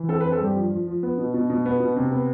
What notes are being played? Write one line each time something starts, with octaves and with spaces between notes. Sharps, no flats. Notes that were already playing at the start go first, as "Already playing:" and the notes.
Already playing: E3
C4 A4
B4
C4
A4
G2 G4
F3
F3
F3
B3
B2
B2
B2
B3
B2
C3
B3